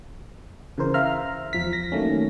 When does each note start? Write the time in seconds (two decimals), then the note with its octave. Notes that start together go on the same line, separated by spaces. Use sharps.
0.78 C#3 E3 A#4 C5
0.94 E5 F5 A#5 F6
1.53 E2 F3 B6
1.73 A#6
1.92 D#3 F#3 A3 A#3 C#4